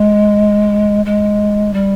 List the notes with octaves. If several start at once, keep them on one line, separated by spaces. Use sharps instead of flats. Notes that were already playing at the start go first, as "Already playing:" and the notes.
Already playing: G#3
G#3
G3